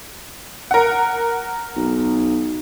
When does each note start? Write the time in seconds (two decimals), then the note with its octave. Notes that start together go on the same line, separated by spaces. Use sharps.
0.71 A#4 F#5
1.76 B1